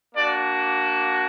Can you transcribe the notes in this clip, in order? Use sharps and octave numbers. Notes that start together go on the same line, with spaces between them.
A#3 D4 F#4 D5